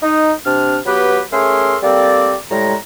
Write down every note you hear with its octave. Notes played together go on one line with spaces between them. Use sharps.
D#4
C3 D4 F6
F#3 B3 G4 B4
A3 C#4 G#4 A#4 E5 C6
G3 A#3 C4 A4 D5
A2 G3 G#3 A#5